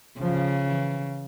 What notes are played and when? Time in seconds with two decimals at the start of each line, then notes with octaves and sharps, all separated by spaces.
0.20 C#3 F3
0.67 E3